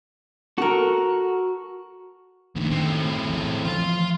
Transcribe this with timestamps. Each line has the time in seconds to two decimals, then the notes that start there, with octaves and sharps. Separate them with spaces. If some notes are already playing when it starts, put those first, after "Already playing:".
0.58 F#4 A4 A#4
2.56 D2 G#2 D#3
2.70 A2 C4
3.29 E3
3.65 E3 F3 F5 C6